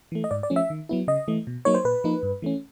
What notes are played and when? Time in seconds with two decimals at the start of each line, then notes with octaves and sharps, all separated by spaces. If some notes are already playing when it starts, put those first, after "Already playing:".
0.12 E3 A3
0.24 D#5
0.31 G#2 D5
0.43 D5
0.50 F3 A3 C#4
0.56 E5
0.70 D#3
0.89 F#3 B3 E4
1.08 C#3 D#5
1.28 E3 A3
1.47 B2
1.65 F#3 A#3 D#4 C#5
1.74 C5
1.84 A#2 B4
2.04 F3 A#3 D#4
2.23 G2
2.42 E3 A3 C#4